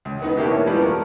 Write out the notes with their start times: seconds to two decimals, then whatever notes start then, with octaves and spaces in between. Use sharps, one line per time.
0.05 C#2
0.22 B3 D#4
0.37 B2 A#3 B3 D4 E4 G4
0.51 C#4
0.65 E3 F3 G3 G#3 B3
0.79 A3 A#4